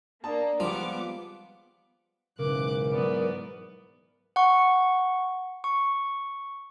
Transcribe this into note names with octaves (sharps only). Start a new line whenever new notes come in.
A#3 D4 A5 D#6
D#2 F3 G3 G#3 B3 F4 D6
B1 G#2 C#3 E3 A#4 D6 F#6
F#3 B3 D5
F#5 C#6
C#6